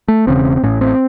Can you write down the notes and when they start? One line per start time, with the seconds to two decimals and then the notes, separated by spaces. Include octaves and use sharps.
0.08 A3
0.27 E1 E2 C#3 C4
0.63 A1 A2 C#4
0.81 C4